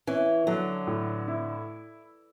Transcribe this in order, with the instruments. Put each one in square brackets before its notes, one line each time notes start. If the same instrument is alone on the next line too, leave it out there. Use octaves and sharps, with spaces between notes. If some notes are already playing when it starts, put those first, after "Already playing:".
[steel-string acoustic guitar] E3 [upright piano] C#4
[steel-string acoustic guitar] D3 [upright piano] F#3
[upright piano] A2
E4